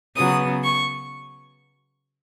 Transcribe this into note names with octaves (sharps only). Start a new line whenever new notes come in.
C#3 F#3 B3 D#6
C#6